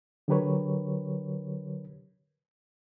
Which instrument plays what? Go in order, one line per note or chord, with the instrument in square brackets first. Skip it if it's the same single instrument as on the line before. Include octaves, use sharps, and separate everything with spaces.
[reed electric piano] D3 F#3 G4 A#4 B4 C#5